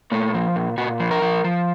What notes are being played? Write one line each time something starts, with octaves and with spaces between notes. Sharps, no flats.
A#2 A3
F3
A#2
A#2 F#4
F3
A#4
F3
F3